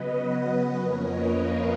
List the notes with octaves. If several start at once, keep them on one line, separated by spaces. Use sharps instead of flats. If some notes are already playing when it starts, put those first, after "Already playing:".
Already playing: C#3 F#3 B3 B4 D#5
D#5 F#5
F2 F3 A#3 C#4 A#4 C#5
B4 D#5
C#5 F5